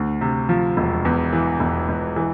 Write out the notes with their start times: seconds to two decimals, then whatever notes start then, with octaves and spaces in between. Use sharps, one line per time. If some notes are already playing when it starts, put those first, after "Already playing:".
Already playing: D2
0.21 C3
0.49 F3
0.77 E1
1.05 E2
1.33 E3
1.60 E1
1.89 E1
2.16 E3